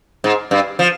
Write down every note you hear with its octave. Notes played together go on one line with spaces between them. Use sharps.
G#2
G2
F3